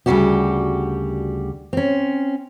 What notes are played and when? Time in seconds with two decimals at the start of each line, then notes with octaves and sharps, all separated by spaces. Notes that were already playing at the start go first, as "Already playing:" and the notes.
0.06 D2 C#3 E3 G3 F#4 G4
1.73 C4 C#4